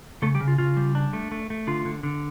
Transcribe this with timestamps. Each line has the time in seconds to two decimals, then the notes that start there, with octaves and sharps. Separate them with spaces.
0.22 C#3 A3 A4
0.35 G3 G4
0.40 C#3
0.48 F4
0.58 C#3 F4
0.77 G3
0.95 D4
1.13 A3
1.32 A3
1.50 A3
1.67 D3 F4
1.85 D3
2.03 D3